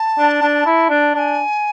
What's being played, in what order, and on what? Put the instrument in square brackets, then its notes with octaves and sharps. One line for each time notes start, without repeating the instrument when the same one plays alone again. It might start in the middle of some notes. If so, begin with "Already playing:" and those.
Already playing: [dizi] A5
[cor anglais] D4
D4
E4
D4
[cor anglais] D4 [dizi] G#5 A5